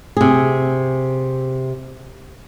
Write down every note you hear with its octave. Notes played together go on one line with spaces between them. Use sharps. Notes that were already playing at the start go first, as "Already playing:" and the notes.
C3 G#4